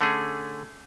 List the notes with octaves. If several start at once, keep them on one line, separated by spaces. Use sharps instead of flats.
D3 A3 C#4 G#4